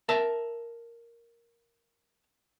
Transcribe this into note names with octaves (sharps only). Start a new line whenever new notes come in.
A#4 E5 A5